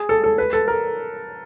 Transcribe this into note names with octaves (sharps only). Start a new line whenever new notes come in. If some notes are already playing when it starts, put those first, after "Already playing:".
Already playing: G#4
A4
A4
B4
A4
A#4